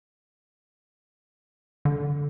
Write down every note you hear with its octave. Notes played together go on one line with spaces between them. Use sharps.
D3